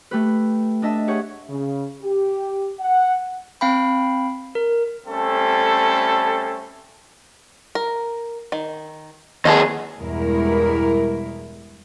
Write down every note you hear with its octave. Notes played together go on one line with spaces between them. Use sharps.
A3 G4 B4
D4 D#5 E5 A5
G4 G#4 C#5 F#5
C#3
G4
F#5
C4 F5 G5 B5
A#4
G3 A3 C4 C#4 A4
A#4
D#3
D#2 B3 G#4 A4 D#5
E2 G2 B2 G#3 E4 A#4